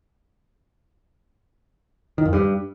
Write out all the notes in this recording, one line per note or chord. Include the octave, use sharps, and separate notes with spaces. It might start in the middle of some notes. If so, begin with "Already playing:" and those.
D#3
F2
G2